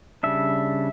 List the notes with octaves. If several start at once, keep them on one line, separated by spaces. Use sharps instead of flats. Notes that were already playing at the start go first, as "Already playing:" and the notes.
C#3 G3 D4 E5